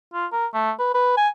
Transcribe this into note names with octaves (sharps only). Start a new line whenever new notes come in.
F4
A#4
A3
B4
B4
G#5